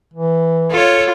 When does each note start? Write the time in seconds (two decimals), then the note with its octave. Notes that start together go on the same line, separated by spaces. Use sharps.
0.14 E3
0.71 F4 A4 C#5